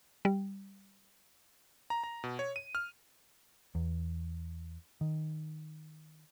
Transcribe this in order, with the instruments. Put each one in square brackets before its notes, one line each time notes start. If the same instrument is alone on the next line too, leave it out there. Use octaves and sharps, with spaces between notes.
[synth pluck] G3
[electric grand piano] A#5
A#5
B2
C#5
D#7
F6
[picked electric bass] E2
D#3